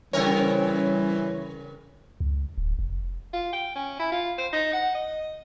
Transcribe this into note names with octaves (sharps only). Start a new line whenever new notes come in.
C#3 E3 G3 C4 C#4 A#4 C#5
C#2
D1
F1
F4
G5
C#4
E4
F4
C5
D#4
F#5
D#5